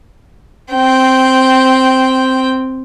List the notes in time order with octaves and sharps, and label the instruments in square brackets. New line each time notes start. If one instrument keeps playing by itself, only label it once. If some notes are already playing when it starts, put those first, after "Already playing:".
[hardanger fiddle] C4 G5